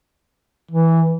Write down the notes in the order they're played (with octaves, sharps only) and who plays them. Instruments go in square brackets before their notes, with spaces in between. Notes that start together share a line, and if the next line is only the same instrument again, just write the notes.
[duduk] E3